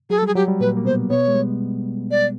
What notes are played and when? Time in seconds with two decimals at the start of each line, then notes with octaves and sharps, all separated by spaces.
0.10 F#3 G#4
0.18 A4
0.23 G3 G#4
0.35 F#3 G4
0.48 G3
0.60 A#2 A#3 B4
0.77 A#3
0.85 B2 B3 C5
1.10 B2 B3 C#5
1.28 G#3
1.35 G3
2.11 D5